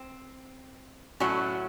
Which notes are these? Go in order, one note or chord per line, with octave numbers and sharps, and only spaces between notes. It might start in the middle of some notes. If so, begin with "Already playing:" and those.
Already playing: C4
A2 F#3 A3 C#4